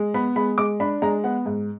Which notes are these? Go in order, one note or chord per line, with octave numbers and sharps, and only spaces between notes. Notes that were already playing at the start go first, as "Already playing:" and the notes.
Already playing: G#3
B3 B5
G#3 B5
G#3 D6
D4 B5
G#3 A#5
B3 F#5
G#2